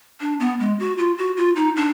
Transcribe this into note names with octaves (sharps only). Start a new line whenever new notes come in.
D4
B3
G#3
F#4
F4
F#4
F4
D#4
D4